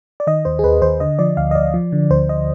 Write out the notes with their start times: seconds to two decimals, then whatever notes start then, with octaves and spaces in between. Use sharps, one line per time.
0.20 D5
0.27 D#3 D#5
0.45 D#2 C5
0.59 G#4
0.64 D#2 B4
0.82 D#2 C5
1.00 D3 D#5
1.19 F3 D5
1.37 D2 F5
1.51 D#5
1.55 D2 D5
1.74 F3
1.92 D3
2.10 D2 C5
2.29 D#5